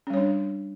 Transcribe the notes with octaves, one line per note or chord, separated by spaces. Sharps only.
G3 C#4 D4 C#5